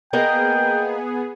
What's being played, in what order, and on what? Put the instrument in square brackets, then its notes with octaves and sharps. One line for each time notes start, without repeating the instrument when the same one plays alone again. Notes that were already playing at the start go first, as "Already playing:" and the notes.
[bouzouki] A#3 A#4 D#5 [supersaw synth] B3 G#4 [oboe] G5